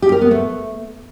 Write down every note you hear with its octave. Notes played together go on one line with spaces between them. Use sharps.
G4
A#4
B3
A3